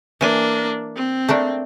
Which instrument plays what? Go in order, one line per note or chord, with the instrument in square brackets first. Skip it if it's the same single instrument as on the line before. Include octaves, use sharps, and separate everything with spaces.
[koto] E3 G#5 [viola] A#3 D4
[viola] C4
[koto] A3 A#3 D4